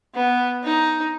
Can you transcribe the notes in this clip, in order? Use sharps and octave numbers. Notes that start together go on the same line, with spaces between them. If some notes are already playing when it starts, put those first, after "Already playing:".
B3
D#4